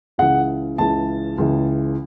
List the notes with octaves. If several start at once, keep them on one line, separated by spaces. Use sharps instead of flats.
C#2 C#3 E3 F#5
C#2 C#3 E3 A5
C#2 C#3 E3